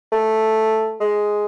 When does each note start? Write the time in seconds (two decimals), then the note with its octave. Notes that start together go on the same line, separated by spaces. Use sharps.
0.12 A3
1.00 G#3